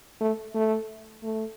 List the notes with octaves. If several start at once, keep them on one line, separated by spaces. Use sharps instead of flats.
A3
A3
A3